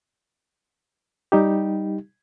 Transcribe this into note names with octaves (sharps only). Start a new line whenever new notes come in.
G3 D#4 G4